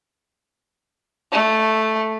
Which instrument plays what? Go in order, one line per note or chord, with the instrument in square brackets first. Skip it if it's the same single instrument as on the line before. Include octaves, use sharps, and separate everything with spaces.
[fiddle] A3